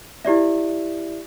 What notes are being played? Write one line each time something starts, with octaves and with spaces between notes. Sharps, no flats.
E4 G4 D5 E5